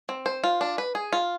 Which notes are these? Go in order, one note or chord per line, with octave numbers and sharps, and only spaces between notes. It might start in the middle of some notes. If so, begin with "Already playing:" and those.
C4
C5
F4
D4
B4
G#4
F4